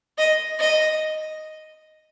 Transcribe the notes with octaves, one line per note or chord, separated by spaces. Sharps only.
D#5
D#5